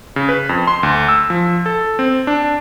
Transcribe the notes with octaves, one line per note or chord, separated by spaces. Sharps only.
C#3
B4
F2
C6
D2
E6
F3
A4
C4
D4